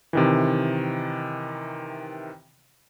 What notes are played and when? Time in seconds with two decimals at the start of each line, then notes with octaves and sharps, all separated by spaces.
0.13 C3 D#3 E3